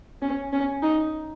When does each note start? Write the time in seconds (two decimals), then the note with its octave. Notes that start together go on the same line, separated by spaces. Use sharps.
0.22 C#4
0.53 C#4
0.83 D#4